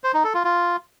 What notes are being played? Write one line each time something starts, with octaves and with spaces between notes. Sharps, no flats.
C5
D#4
A4
F4
F4